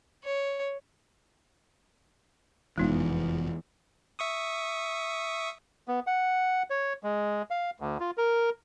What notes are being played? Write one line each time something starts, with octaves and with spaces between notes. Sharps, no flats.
C#5
F1 E2 B2 E3 F3 G#3 D#4
E5 C#6 D#6
B3
F#5
C#5
G#3
F5
D2
F4
A#4